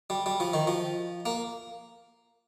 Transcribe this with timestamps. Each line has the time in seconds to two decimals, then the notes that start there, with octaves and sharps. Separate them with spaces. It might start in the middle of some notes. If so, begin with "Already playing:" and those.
0.10 G3
0.26 G3
0.40 F3
0.54 D#3
0.67 F3
1.26 A#3